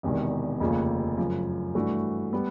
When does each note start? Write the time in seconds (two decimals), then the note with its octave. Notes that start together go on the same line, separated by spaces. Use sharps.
0.03 E1 E2 C3 D#3
0.60 F1 D#2 C#3 F3
1.18 F#2 C#3 F3
1.75 G2 E3 A3 D4 F#4
2.33 G3 B3